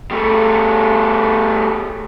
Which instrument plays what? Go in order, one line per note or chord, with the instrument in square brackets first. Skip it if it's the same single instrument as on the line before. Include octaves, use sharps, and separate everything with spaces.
[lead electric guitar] G3 A3